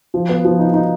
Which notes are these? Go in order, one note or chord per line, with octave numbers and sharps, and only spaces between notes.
F3
B3
F3
D#4
D#4